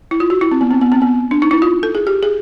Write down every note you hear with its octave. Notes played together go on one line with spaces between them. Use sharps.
E4
F4
F#4
E4
C4
B3
C4
B3
C4
B3
D4
D#4
E4
F4
A4
G#4
G4
G#4